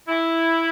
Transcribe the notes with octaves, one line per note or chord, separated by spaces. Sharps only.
E4